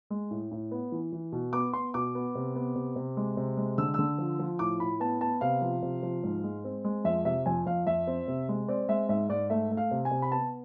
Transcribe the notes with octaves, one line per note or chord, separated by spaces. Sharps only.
G#3
A2
A2
B3
E3
E3
B2
B3 D6
B3 C6
B2 D6
B3
C3
B3
C3
C3
G#3
C3
G#3
D3 E6
D3 E6
F3
F3
A2 D6
A2 B5
B3 A5
B3 A5
C3 F5
F3
C3
F3
G#2
G#3
C4
G#3
F2 E5
C3 E5
F2 G#5
F2 F5
F2 E5
C4
C3
G#3
C4 D5
G#3 E5
G#2 E5
G#2 D5
A3 E5
A3
F5
C3
G#5
C3
B5
B3 A5